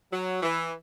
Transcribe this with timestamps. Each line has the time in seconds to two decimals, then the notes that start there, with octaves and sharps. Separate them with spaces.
0.11 F#3
0.43 E3